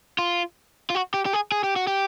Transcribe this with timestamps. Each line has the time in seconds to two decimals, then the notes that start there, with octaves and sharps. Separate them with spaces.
0.19 F4
0.90 F4
0.95 F#4
1.14 G4
1.26 G4
1.33 G#4
1.52 G#4
1.64 G4
1.76 F#4
1.87 G4